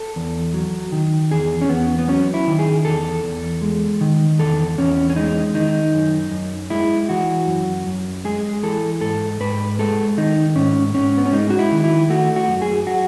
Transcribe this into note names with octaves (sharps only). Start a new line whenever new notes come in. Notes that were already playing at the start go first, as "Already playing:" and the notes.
Already playing: A4
E2
F#3
D#3
E2 G#4
C#4
E2 B3
B3
F#3 C#4
E4
D#3
G#4
E2 A4
E2
G#3
D#3
E2 A4
E2 C#4
C#4
G#3 D#4
D#3 D#4
F#2
F#2
G#3 E4
E3 F#4
F#2
F#2
G#3 G#4
E3 A4
G#2 A4
G#2 B4
G#3 A4
D#3 D#4
G#2 C#4
G#2 C#4
B3
C#4
G#3 D#4
F#4
E4
D#3
E4
A3 F#4
F#4
F#2
G#4
F#3 F#4